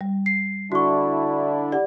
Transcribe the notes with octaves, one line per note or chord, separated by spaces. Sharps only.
G3
C7
D3 D4 E4 F#4 C#6
G4 D5 F#5